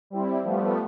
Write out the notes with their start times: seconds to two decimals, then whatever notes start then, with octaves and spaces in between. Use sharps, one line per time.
0.10 G3 C4 E4
0.43 F3 G3 A3 B3